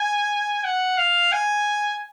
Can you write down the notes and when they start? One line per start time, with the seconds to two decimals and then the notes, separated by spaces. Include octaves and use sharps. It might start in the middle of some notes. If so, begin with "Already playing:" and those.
Already playing: G#5
0.64 F#5
0.98 F5
1.32 G#5